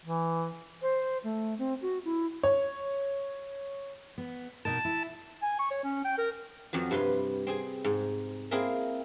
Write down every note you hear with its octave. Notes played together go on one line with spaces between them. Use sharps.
E3
C5
A3
C4
F#4
E4
C#5
B3
B2 D#4 A#4 A5
E4
G#5
C#6
C#5
C#4
G5
A#4
F2 F3 F#3
G2 C3 B4 C6
C4 G#4 G#5
G#2
A#3 C4 E4 G#4 A#4 E5